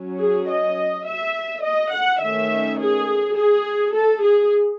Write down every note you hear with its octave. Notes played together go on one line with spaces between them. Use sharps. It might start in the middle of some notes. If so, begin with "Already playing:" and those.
Already playing: F#3 C#4
G#4
D#5
E5
D#5
F#5
D#3 A3 C#4 E5
G#4
G#4
A4
G#4